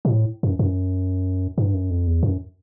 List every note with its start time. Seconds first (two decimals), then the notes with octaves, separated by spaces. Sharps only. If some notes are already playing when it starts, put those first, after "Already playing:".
0.05 A#2
0.11 A2
0.43 F#2
0.59 F#2
1.58 G2
1.74 F#2
1.90 F2
2.07 E2
2.23 F#2